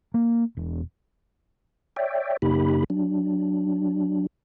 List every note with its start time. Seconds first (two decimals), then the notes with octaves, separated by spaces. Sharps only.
0.14 A#3
0.57 E1
1.96 C#5 D5 E5 G5
2.42 F#2 C#3 A#3 D#4 G4 B5
2.90 F#3 D4